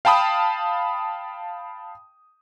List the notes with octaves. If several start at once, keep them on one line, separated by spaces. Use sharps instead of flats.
F5 G5 A5 B5 D#6